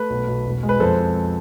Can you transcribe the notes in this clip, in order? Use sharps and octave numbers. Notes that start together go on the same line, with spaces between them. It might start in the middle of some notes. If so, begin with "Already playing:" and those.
Already playing: A3 B4
B1
B1
E1
G#3
B4
F2 A4 C5
C4